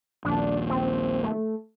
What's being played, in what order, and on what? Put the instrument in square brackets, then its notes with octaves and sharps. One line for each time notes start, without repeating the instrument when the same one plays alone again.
[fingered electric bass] A#1 D#2 [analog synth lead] D4
[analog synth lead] C4
A3